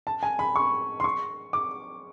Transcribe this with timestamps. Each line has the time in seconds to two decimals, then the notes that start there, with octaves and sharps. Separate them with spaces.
0.07 A5
0.23 G#5
0.39 B5
0.56 C#6
1.00 C6
1.04 C#6
1.53 D6